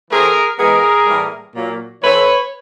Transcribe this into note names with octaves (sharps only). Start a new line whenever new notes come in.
E3 A3 C4 G#4 A#4
E3 G#3 B3 G#4 A#4
A2 E3 G3 A#3
A#2 F#3 A#3
E3 A3 C4 B4 C#5